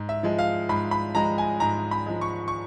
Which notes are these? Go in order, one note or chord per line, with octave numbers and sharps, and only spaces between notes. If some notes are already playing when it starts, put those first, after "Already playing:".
Already playing: G#2
E5
F3 G#3
F5
G#2 B5
B5
F3 G#3 A#5
G#5
G#2 A#5
B5
F3 G#3
C#6
C#6